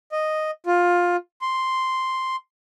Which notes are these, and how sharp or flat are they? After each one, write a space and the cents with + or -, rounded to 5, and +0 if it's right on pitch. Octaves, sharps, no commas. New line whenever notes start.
D#5 -5
F4 +15
C6 +0